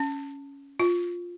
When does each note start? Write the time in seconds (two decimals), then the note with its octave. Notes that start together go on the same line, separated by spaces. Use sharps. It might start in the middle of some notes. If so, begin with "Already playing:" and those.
Already playing: C#4
0.80 F4